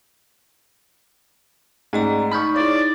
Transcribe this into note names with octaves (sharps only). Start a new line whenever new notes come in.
G#2 A3 D5 D#5 A#5
D#4 B5 C#6 D#6 F6 G6
E4 C#5 D5